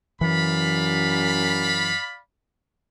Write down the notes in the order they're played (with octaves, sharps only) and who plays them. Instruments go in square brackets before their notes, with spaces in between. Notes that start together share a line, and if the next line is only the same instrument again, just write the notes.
[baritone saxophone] F#2 [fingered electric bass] E3 [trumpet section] D5 F5 B5